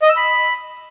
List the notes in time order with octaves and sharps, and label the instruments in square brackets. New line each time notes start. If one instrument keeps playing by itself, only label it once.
[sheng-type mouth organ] D#5
E6
B5